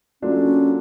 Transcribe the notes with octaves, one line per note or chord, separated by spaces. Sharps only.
F#3 A#3 C#4 D4 F4 A4